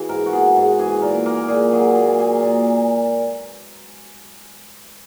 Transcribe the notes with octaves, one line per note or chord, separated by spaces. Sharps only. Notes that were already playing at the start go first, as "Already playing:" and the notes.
Already playing: E3 F#4 G#4
G#2 A#4
F#4
B3 G#4
G#2
E3 G#4
A#2 A#4
A#3 A#4
A#2 G#4
F#3 G#4
A#2 G#4
A#3 G#4
A#2